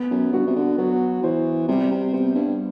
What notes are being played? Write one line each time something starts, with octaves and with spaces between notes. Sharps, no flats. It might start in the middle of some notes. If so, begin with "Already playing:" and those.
Already playing: B3
F#2
G2 F#4
C3
D3
F#3 B3
E3 C5
C3 G3
C3
C3 B3
G2